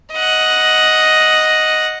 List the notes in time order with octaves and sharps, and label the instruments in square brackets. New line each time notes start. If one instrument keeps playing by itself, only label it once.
[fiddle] D#5 F#5